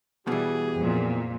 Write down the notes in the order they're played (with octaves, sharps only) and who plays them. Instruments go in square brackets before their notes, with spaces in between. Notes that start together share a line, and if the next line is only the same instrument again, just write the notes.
[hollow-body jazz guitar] B2 E3 [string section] G3 [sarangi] G#4
[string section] F2 A#2